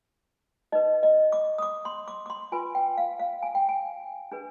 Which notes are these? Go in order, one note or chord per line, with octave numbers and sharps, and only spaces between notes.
D#4 B4 D#5
D#5
D6
D#6
D6
C6
D6
D6
C6
F4 B4 G#5
G5
F5
F5
G#5
G5
G#5
D4 G#4 B4